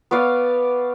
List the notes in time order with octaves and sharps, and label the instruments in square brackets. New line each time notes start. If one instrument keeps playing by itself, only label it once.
[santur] B3 C#5 D5 F5